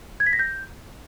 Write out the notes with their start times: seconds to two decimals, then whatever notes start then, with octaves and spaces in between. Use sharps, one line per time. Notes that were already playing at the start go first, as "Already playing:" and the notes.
0.20 G#6
0.27 B6
0.33 A#6
0.39 G6